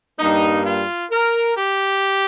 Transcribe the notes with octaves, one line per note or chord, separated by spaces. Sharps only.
G2 G3 A#3 D#4
F4
A#4
G4